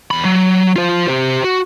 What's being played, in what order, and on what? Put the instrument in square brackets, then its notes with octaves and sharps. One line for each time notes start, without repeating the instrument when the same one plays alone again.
[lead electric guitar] E2 B5
F#3
F4 C5
G4 C5
F#4